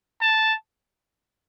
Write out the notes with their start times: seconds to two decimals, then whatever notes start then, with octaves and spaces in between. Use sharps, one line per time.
0.21 A5